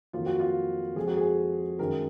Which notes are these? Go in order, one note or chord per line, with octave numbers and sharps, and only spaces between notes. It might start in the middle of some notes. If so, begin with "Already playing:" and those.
F2 D#3 F#3 A#3 F4
F#4
F4
F2 F3 G#3 G#4
F#4
G#4
F#2 D#3 G#3 A#4